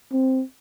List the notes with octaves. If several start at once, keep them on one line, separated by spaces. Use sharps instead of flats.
C4